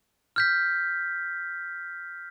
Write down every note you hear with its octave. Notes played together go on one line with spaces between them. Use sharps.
F6 G6 B6